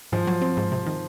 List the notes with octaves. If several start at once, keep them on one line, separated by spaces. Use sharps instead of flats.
G#2 F3
F#3
C4
G#2
C3
D#3